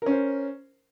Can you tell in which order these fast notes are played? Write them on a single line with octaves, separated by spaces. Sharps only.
A#4 C#4 C5